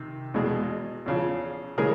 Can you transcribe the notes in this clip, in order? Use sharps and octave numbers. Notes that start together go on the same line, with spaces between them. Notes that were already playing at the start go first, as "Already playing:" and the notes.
Already playing: C3 D#3
E2 B2 G#3
E2 C#3 F3
C#3 E3 G#3 G#4 A#4